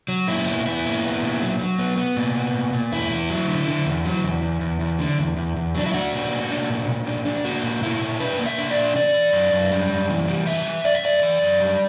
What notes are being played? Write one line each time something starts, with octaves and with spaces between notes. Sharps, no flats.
F#3
A#2 E4
B3
B3 E4
A#2
B3
A#2
F#3
F#3
B3
B3
A#2
B3
A#2
A#2
E2 E4
E2
F#3
D3
D3
E2
F#3
E2
E2
E2
E2
D3
E2
E2
E2
F#3 D4
E4
D4 F#4
A#2
A#3
D4
A#2
A#2
D4
D4
A#3 F#4
A#2
A#2 E4
A#2
D4 B4
A#3
E5
D4
D5
A#2
E3 D5
E3
F#2
F#2
G3
F#2
E3
G3
E3 E5
E3
F#2 D5
E5
F#2 D5
E3 D5
F#2
G3